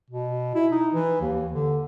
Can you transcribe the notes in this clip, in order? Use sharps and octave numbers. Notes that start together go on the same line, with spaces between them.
B2
E4
D#4
E3
D#2
D3